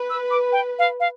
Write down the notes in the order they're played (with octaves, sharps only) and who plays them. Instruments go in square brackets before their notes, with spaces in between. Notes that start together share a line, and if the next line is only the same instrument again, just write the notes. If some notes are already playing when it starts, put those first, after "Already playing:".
Already playing: [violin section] B4
[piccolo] E6
D6
G5
F5
F5